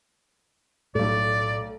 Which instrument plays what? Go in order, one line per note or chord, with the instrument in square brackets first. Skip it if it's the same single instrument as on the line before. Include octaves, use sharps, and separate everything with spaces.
[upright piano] B1 A3 [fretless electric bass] A2 [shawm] D5